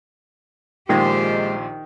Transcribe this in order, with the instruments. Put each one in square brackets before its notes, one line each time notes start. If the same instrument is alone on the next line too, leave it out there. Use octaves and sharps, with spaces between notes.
[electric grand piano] A#1 A#2 F4 [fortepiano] D#3 [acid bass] G#3 [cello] G4 C5